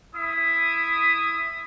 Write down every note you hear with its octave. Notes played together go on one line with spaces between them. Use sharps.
E4 E5 D#6